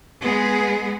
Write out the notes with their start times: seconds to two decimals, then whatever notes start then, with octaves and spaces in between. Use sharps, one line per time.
0.23 G#3 B3 G#4